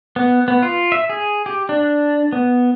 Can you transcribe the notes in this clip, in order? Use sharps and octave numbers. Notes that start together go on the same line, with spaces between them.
B3
B3
F4
E5
G#4
G4
D4
B3